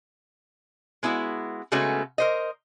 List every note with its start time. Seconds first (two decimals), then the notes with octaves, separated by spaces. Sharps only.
1.03 G#3 B3 E4 F#4
1.72 C#3 G#3 A3 B3 C#4 F#4
2.18 A#4 C5 D#5